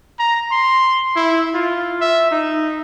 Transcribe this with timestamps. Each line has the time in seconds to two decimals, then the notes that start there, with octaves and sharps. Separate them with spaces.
0.19 A#5
0.51 C6
1.16 E4
1.54 F4
2.00 E5
2.31 D#4